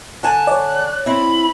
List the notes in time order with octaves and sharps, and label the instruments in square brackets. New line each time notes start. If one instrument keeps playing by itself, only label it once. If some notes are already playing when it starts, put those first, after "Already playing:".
[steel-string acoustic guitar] D3 G#5 A5 [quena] F#6
[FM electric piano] C#5 D5
[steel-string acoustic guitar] C4 E4 [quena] B5